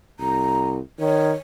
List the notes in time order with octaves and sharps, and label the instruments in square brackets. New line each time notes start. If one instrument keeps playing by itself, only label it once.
[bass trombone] C2 [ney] A#5
[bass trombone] D#3 [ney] C#5